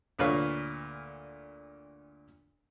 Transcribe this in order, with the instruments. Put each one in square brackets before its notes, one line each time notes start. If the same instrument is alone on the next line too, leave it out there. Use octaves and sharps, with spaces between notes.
[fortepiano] D2 A#2 B4 C#5 F5